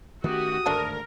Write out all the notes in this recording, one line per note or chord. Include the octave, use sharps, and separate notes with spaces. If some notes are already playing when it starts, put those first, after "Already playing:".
D#3 A3 C#4 F#4 G4 D#6
G#1 D2 G2 A3 D4 A4 A#4